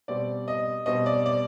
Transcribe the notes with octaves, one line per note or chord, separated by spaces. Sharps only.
B2 G3 C4 D5
D#5
B2 G3 C4 D#5
D5
D5